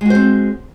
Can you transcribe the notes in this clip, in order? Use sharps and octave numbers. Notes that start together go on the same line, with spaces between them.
G#3 C4 F#4 C5